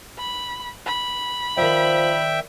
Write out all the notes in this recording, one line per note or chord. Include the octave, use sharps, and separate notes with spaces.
B5
B5
D#3 F3 C5 D5 E5 G5